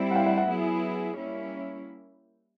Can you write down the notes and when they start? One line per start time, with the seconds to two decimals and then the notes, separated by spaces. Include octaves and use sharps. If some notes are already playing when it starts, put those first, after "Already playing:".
Already playing: G3 C4 E4
0.11 F#5
0.15 F5 G5
0.26 E5 F#5
0.37 E5 F#5
0.49 F#3 B3 E4 G#4
1.14 G3 A#3 C#4 E4